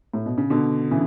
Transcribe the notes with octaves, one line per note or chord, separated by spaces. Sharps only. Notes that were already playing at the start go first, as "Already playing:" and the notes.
A2
B2
C#3
B2 D3
C#3 E3